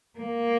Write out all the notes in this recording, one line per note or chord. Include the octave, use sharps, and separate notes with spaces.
A#3